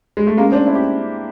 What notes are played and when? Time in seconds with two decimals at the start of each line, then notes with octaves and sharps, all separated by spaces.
0.17 G#3
0.27 A3
0.37 G#3 A#3 C#4
0.52 C4 D4
0.66 D4 E4
0.75 G4